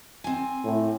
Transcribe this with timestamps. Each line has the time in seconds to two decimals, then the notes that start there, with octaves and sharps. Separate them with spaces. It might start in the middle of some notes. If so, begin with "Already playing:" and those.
0.24 C4 G#5
0.64 A2